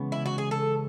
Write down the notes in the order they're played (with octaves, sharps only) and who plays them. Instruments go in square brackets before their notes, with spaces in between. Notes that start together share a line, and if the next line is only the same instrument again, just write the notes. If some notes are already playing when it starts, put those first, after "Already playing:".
Already playing: [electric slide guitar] C#3 E3 G#3 C#4 [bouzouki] B3
[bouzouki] E4
F#4
G#4
A4